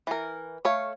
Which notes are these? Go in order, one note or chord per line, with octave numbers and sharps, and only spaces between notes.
E3 A#4
A3 C#5 F5